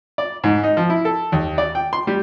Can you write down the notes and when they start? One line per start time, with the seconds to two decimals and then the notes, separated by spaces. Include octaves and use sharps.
0.18 D5
0.44 G#2
0.63 D#4
0.77 F3
0.90 E4
1.05 A4
1.32 D#2
1.58 D5
1.75 G5
1.93 C6
2.07 G3